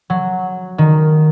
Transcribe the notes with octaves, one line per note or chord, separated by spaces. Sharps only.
F#3
D#3